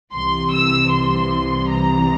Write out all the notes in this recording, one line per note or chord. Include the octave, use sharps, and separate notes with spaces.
C2 C3 E3 C6
E6
C6
A#5